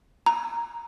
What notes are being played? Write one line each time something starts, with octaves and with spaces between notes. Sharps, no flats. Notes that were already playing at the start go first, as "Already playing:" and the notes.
A#5